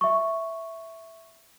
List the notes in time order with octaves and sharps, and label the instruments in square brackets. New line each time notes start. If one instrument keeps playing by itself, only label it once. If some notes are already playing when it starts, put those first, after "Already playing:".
[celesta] E5 C#6